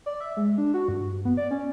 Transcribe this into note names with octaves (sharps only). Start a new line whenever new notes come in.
D5
E5
G#3
D4
F#4
G2
B3
D5
C#4